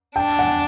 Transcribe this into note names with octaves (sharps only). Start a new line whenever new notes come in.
D4 G5 A5
F#5 G#5